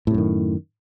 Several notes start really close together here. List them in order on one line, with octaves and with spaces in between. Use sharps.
A2 C3 F#2 D#3